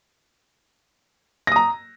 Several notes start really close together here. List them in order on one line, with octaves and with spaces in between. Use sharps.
A#6 D#6 A#5